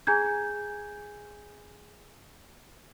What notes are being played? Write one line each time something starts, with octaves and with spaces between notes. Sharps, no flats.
G#4 G#5 A#5 G6 G#6